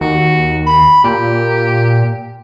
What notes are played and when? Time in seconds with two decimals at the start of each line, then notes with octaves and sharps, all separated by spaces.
0.01 D#2 F#4
0.67 B5
1.04 A#2 G4